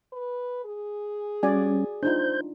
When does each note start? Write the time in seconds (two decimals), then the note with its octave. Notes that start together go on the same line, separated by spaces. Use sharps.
0.13 B4
0.65 G#4
1.43 G3 C#4 F#4 D5 G#5
2.03 D4 D#4 F4 C5 G6